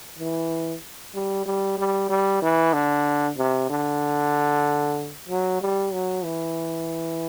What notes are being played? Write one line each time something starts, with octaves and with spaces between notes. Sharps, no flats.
E3
G3
G3
G3
G3
E3
D3
C3
D3
F#3
G3
F#3
E3